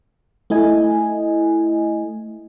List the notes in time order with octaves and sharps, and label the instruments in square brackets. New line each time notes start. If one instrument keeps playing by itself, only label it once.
[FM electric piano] A3 E4 D#5 G#5